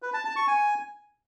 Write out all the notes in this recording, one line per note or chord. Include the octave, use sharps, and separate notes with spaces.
B4
A5
A5
C#6
G#5